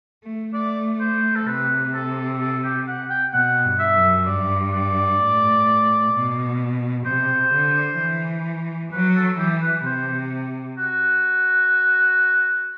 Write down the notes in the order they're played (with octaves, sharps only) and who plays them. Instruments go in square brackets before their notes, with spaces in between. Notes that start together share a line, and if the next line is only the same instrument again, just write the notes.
[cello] A3
[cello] A3 [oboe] D5
[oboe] C5
A4
[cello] C3 [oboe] B4
[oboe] A4
A4
G4
F#5
G5
[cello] B2 [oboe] F#5
[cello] G2
[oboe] E5
[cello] F#2
[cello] G2 [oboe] D5
[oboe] D5
[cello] A2
B2
[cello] C3 [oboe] C5
[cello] D3
E3
[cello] F#3 [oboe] B4
[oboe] A4
[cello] E3 [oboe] G4
[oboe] B4
[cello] C3 [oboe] C5
[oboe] F#4